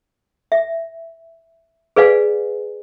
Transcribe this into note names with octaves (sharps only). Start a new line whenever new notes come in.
E5
G#4 B4 D5 F5 G#5